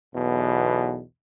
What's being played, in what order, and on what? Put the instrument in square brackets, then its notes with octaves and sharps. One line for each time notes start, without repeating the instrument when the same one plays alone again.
[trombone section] B1 E2 B2